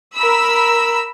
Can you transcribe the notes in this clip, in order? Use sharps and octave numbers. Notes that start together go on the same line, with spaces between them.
A#4 B5 E6